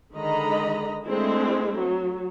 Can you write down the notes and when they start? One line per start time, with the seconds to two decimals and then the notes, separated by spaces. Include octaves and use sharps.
0.14 D3 D#3 G#3 D#5 A#5 B5
1.04 G#3 A3 C4 D4 E4
1.77 F#3